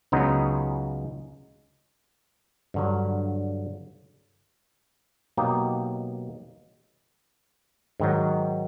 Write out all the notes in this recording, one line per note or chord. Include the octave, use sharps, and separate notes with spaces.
C#2 C#3 F#3 B3 D#4
G2 D3 F#3
B2 F#3 A#3 D#4 G4
G#2 D#3 F#3